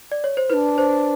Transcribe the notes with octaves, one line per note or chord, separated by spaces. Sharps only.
D5
C#5
C5
D4 E4 B4
C5